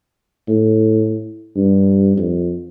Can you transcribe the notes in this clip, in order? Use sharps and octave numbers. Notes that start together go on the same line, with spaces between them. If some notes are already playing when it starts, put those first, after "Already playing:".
A2
G2
F2